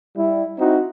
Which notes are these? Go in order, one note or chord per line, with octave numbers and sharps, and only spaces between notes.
G3 E4
C4 D#4 E4 F#4